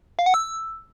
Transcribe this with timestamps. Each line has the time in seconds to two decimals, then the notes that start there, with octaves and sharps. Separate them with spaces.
0.19 F5
0.26 F#5
0.34 E6